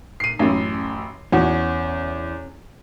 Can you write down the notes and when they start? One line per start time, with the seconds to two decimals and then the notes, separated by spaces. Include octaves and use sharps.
0.20 C7 D#7
0.39 A1 F#2
1.32 E2 C#4 F#4